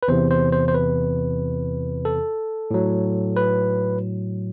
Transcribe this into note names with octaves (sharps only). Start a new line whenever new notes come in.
B4
E2 C3 E3 C5
C5
C5
C5
B4
A4
A2 F#3
B4